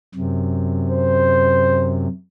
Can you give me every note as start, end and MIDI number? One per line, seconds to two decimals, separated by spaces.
0.15 2.07 42
0.15 2.07 48
0.89 1.96 72